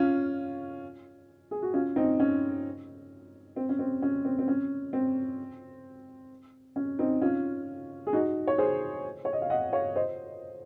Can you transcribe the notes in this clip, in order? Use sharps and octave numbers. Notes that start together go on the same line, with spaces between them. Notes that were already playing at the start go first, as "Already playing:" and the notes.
Already playing: C#4 F4
G#4
F#4
C#4 F4
C4 D#4
C#4
C4
C#4
C4
C#4
C4
C4
C#4
C4
C#4
C4 D#4
C#4 F4
G#4
D#4 F#4
C#5
G#4 C5
C#5
D#5
F5
D#5 F#5
C#5 F5
C5 D#5